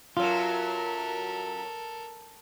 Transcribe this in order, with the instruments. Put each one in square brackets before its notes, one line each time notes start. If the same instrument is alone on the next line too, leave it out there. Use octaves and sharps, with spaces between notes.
[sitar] F#2 F#3 [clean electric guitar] F4 [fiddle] A4 A#4